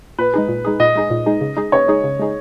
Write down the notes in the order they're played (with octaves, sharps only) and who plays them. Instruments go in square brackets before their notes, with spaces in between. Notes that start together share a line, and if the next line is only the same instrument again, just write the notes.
[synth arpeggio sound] A#2 [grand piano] B4
[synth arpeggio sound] G#3 D#4 G#4
A#2
G#3 D#4 G#4
[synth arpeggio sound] A#2 [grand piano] D#5
[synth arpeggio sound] G#3 D#4 G#4
A#2
G#3 D#4 G#4
C#3
G#3 D#4 G#4
[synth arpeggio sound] C#3 [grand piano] C#5
[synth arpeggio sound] G#3 D#4 G#4
C#3
G#3 D#4 G#4